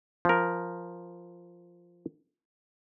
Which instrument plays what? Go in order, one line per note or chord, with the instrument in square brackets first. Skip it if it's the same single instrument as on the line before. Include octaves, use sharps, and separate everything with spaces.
[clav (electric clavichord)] F3 A#4